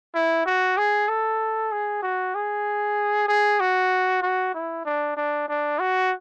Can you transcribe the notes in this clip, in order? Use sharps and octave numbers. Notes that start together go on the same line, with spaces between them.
E4
F#4
G#4
A4
G#4
F#4
G#4
G#4
F#4
F#4
E4
D4
D4
D4
F#4